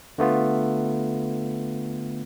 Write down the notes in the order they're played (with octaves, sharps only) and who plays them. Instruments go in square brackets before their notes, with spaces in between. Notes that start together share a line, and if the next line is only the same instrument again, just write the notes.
[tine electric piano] D3 A3 B3 F4